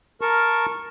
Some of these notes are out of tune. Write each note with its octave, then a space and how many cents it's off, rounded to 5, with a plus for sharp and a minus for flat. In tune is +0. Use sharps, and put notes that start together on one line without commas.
A#4 +0 A5 +0 C#6 -10